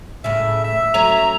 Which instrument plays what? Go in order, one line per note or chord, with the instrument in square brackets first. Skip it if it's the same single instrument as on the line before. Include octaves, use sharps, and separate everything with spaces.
[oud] A2 C#3 [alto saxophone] E5
[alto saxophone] E5
[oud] F#3 A3 C#4 [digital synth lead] A#5